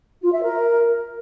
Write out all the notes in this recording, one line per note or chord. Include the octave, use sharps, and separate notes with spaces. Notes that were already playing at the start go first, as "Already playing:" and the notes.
F4
E5
A#4